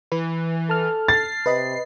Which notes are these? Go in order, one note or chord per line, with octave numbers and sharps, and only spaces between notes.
E3 B4
A4 A5 F6
A6 C7
C3 B4 D#5 B5